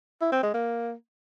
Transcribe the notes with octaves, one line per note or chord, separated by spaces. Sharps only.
E4
C4
G#3
A#3